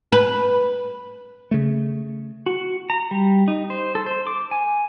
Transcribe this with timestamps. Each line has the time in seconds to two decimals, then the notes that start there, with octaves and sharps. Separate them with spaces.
0.12 B4
1.51 C#3 A3
2.46 F#4
2.90 A#5
3.11 G3
3.48 D#4
3.70 C5
3.95 A4
4.06 C5
4.27 D6
4.51 G#5